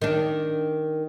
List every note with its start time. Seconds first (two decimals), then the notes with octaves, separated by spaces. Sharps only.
0.02 D#3 D4